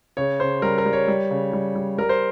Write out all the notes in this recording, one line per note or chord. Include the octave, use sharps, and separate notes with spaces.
C#3 C#5
C#3 C5
G3 A#4
A#4
G3
C#5
G3
C#3
G3
G3
G3 A#4
C5